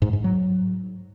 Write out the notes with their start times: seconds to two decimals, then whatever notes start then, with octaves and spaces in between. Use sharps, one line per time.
0.02 G#2
0.13 G#2
0.24 F#3